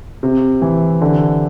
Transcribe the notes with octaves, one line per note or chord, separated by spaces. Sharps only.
C3
E3
D3